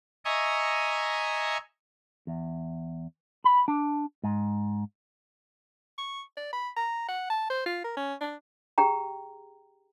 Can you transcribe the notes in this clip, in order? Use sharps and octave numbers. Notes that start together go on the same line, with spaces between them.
D#5 E5 G#5 A#5 C#6 D#6
E2
B5
D4
G#2
C#6
D5
B5
A#5
F#5
A5
C5
F4
A#4
C#4
D4
G4 G#4 G5 A#5